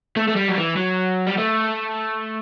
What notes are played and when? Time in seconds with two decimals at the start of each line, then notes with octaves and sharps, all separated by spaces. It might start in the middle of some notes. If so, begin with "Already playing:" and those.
0.17 A3
0.28 A3
0.36 G3
0.49 F#3
0.58 E3
0.77 F#3
1.27 G3
1.37 A3